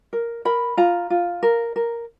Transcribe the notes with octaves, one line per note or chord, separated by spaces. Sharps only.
A#4
A#4 B5
F4 A#5
F4
A#4
A#4